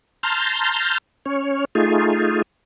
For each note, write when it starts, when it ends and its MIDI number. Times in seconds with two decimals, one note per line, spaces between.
0.23 0.98 81
0.23 0.98 82
0.23 0.98 84
0.23 0.98 89
0.23 0.98 91
1.26 1.65 61
1.26 1.65 73
1.75 2.42 57
1.75 2.42 63
1.75 2.42 65
1.75 2.42 68